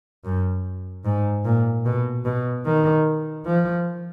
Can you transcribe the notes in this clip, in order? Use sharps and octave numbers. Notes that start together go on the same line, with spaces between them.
F#2
G#2
A#2
B2
B2
D#3
F3